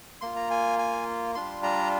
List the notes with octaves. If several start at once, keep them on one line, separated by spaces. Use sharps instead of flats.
A#3 F4 C6
A#5
G#5
G#5
G3 D4 F4 C6
A#5